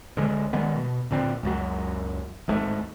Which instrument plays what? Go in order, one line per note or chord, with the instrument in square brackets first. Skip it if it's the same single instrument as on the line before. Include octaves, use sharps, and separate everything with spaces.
[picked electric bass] D2 D3 G#3
D#3 G3 G#3 B3
B2
D1 A#2 D3 C4
C#2 F#2 F#3
D1 G#1 G#2 A3